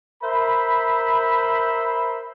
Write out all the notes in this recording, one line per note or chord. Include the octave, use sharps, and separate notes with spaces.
A#4 C5 E5 B5